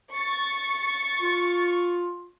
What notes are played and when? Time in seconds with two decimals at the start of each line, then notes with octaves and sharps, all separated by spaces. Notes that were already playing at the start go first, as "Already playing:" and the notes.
0.12 C#6 A6
1.22 F4